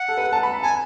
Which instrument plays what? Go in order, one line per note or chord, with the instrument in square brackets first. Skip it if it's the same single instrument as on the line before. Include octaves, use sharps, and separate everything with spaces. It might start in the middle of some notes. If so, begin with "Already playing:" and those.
Already playing: [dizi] F#5
[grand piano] A4
B4
A5
B5
B5
[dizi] G#5 [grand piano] A5